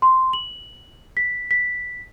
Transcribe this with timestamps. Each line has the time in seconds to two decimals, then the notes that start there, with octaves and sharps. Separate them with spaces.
0.02 C6
0.33 F#7
1.17 B6
1.51 B6